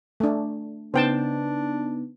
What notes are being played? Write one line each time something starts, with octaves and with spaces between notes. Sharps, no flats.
A3 D4
C#3 B3 D4 D#4 C5 G5 A5